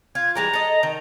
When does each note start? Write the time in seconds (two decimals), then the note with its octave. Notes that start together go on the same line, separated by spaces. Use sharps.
0.15 F4 G#6
0.35 E3 G3 G#3 A#5
0.53 A4 D#5
0.83 D#3